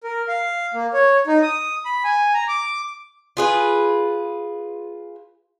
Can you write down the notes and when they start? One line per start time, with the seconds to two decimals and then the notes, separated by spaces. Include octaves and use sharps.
0.04 A#4
0.28 F5
0.74 A#3
0.94 C#5
1.27 D#4
1.42 D#6
1.85 B5
2.04 G#5
2.34 A#5
2.48 D6
3.37 F4 G#4 B4